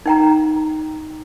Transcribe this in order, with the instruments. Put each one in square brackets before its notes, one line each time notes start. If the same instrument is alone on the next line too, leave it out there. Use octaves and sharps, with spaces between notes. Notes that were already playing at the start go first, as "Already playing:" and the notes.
[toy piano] D#4 G5 A#5